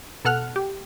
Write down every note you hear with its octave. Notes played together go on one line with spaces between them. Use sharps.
B2 A4 F#5 F6 F#6
G4